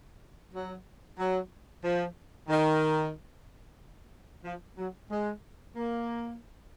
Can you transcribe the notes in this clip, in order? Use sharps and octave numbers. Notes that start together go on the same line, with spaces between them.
F#3
F#3
F3
D#3
F3
F#3
G#3
A#3